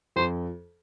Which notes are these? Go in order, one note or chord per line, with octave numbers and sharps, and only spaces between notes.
F2 C5